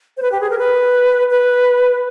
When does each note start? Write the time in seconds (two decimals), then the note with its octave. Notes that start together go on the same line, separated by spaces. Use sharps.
0.17 C5
0.22 B4
0.32 G4
0.41 G#4
0.50 A#4
0.59 B4
1.30 B4